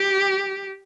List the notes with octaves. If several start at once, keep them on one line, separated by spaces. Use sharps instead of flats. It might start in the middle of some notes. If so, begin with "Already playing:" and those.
Already playing: G4